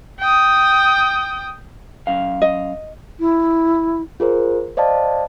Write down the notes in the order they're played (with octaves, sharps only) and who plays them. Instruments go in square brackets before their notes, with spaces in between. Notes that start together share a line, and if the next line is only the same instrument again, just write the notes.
[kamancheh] G5 D#6
[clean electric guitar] F#2 F5
[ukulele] D#5
[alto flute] E4
[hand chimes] F4 G#4 A#4 C5
C5 D5 D#5 F5 A5